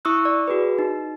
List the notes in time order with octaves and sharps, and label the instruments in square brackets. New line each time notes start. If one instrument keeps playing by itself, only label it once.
[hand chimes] E4 C#6 D#6 E6 F#6
D5
F#4 G#4 B4
D#4